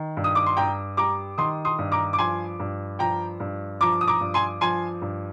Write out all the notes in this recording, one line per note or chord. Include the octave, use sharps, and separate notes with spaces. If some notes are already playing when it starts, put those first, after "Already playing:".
Already playing: D#3
G2
D#6
D6
C6
G2 G5 A#5
G3 A#5 D6
D#3 C6 D#6
C6 D#6
G2
A#5 D6
D6
F3 G#5 C6
G2
F3 G5 A#5
G2
F3 A#5 D6
D#6
A#5 D6
G2
G#5 C6
F3 G#5 C6
G2